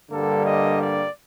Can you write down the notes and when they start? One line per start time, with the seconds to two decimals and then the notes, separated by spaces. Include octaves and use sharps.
0.11 G2 D3 G3 A#3 A4
0.45 D#5
0.80 D5